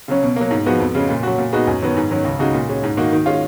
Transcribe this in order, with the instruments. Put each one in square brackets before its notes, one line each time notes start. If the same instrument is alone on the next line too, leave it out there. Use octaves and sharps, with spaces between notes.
[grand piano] C#3 F#3 C#4
B2
F#3 A#3
G#2
F3 G#3 B3 F#4
F2
C#3 G#3
A#2
F#3 C#4 F#4
A#2
G#3 B3 D#4 F#4
F#2
D#3 F#3 B3
G#2
D#3 F#3 C#4
C#2
C#3 G#3 D#4 F#4
A#2
G#3 C#4
G#2
D#3 A#3 D#4 F#4
D#3
G#3 C#4 F4